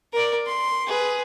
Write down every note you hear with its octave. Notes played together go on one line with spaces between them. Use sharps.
A#4 D5
C6
G#4 B4